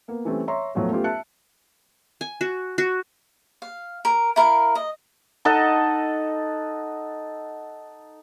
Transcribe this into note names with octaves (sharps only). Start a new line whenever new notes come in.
A#3 B3
E3 G3 A3 C4 C#4
C#5 E5 A#5 C6 C#6
E2 A2 F3 F#3 A3
A3 B3 C#4 F4 G4
E5 A5 F#6 C#7
G#5
F#4
F#4
F5
A#4
E4 A#4 F5
D#5
D#4 A4 D#5 F#5